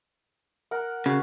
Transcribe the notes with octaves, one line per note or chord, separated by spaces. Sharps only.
A#4 F#5
C#3 F#4